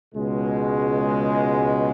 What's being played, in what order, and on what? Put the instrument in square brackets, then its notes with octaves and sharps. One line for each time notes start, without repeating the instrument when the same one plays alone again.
[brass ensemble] C#2 B2 G#3